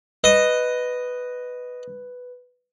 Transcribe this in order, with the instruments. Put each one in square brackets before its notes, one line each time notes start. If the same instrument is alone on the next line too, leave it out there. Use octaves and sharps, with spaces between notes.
[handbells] B4 [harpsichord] D#5